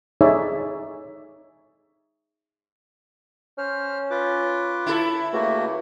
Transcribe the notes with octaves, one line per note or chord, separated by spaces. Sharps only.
D#4 G#4 A4 C#5 D5 E5
C#4 C5 F6
F4 B4 D6
E4 A4
C#2 A3 A#3 F#4